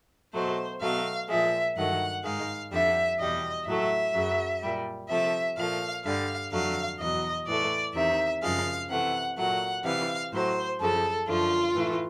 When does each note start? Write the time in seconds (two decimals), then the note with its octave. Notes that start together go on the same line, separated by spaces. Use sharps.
0.34 B2 F#3 A3 C5
0.81 B2 F#3 A3 F5
1.29 A#2 F3 G#3 E5
1.76 G2 D#3 F#3 A3 F#5
2.23 G#2 D#3 G#3 F5
2.72 F2 D3 G3 E5
3.19 E2 B2 G3 D#5
3.66 A2 F#3 A3 E5
4.14 F#2 C#3 F#3
4.62 A#2 G3
5.09 C3 F3 A3 E5
5.57 A#2 F3 A3 F5
6.05 G2 D3 G3 F5
6.51 F2 D3 F#3 A3 F5
6.99 E2 B2 F#3 D#5
7.47 A2 E3 A3 D5
7.94 E2 C3 D#3 E5
8.42 F#2 C#3 F3 G#3 F5
8.89 C3 E3 A3 F#5
9.37 A#2 F#3 A3 F#5
9.84 C3 E3 G3 F5
10.33 A2 F#3 A3 C5
10.80 F#2 C#3 F3 A4
11.27 F#2 D3 F3 A3 F4
11.75 A2 E3 A3